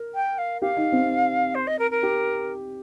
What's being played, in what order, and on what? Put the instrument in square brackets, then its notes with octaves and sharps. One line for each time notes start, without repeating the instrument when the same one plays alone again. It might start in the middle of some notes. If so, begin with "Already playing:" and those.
Already playing: [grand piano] A#4
[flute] G5
F5
[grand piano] G4 [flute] F5
[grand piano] D#4
C4
[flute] C5
D#5
A#4
A#4
[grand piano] G4